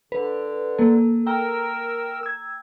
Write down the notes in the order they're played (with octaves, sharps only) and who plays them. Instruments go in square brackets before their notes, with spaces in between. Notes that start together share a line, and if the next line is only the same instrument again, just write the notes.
[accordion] D3 [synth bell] B4
[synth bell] A#3 A4
[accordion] A#4 E6 [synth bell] G5 A#5
[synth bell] E6 G#6